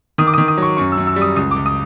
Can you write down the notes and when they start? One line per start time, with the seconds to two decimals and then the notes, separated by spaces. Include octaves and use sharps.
0.18 D#3 D#6
0.27 D6
0.34 D#3 D#6
0.48 D#6
0.58 F#3 C#6
0.77 F#2 C#6
0.92 E6
0.97 F#2
1.07 E6
1.16 G3
1.22 D#6
1.36 C#2 D#6
1.51 D6
1.56 C#2
1.66 D#6